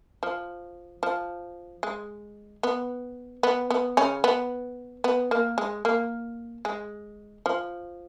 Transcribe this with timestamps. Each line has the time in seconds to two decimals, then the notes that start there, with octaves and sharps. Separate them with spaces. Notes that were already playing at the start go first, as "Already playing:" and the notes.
0.23 F3
1.03 F3
1.83 G#3
2.63 B3
3.43 B3
3.71 B3
3.97 C#3 C#4
4.24 B3
5.04 B3
5.31 A#3
5.58 G#3
5.85 A#3
6.65 G#3
7.46 F3